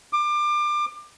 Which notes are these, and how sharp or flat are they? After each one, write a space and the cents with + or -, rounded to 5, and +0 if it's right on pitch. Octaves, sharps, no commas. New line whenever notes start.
D6 +25